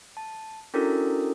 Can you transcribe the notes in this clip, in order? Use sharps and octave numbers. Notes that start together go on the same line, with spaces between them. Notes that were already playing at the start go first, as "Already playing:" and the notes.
A5
C#4 D4 E4 F#4 A4 A#4